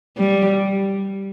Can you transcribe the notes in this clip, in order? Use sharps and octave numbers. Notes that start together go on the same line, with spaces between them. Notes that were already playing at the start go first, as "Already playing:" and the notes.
G3